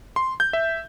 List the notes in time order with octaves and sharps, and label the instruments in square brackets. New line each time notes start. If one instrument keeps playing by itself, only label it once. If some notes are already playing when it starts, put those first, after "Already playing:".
[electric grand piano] C6
G6
E5